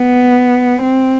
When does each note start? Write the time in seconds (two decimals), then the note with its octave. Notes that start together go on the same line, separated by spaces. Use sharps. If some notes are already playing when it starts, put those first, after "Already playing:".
Already playing: B3
0.82 C4